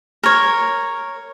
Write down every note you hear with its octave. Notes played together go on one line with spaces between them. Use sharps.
A#4 C#5